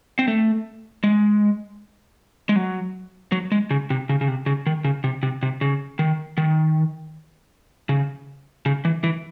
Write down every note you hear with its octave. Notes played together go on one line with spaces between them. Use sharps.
C4
A3
G#3
G#3
F#3
F#3
G#3
C#3
C3
C#3
C#3
C3
C#3
D#3
C#3
C3
C3
C3
C#3
D#3
D#3
C#3
C#3
E3
E3